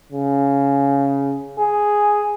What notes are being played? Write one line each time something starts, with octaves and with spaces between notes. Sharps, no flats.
C#3
G#4